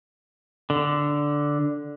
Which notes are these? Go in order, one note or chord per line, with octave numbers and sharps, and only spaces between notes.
D3